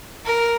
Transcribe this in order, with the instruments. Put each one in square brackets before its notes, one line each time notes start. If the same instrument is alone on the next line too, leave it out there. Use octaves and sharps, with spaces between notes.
[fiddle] A#4